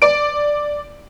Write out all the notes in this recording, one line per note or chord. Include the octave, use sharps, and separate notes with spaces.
D5 D7